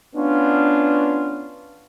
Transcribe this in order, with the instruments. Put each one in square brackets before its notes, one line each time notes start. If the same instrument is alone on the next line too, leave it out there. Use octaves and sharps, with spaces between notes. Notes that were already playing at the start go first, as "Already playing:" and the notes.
[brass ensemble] B3 C#4 D4 F4 F5